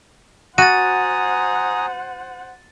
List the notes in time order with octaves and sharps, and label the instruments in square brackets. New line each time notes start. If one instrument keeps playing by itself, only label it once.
[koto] F#4 [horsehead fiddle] C5 F#5 [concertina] G#5 A#5 D#6 [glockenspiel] A6 D#7